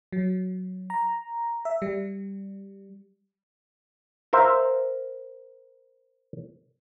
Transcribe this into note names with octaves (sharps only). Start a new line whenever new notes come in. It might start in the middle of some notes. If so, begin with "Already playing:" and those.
F#3
A#5
E5
G3
A#4 C5 E5 F5